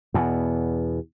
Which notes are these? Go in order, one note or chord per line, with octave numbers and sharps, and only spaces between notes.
E2 B2